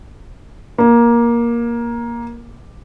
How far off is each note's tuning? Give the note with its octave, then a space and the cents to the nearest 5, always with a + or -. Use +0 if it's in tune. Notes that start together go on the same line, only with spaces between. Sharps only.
A#3 +15